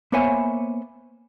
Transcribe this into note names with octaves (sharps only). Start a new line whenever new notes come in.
A#3 B3 C5 C#5 E5 G#5